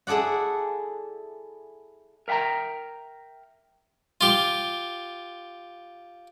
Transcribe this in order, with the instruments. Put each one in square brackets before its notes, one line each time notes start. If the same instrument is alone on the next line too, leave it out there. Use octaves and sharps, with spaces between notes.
[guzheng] E4 G#4 A4 D5 F#5
[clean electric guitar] A#4 E5 F#5 G5 A#5
[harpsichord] F4 G4